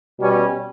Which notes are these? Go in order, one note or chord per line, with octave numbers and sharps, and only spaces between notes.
B2 G3 C#4